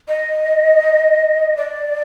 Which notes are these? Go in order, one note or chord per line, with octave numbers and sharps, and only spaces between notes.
D#5
D5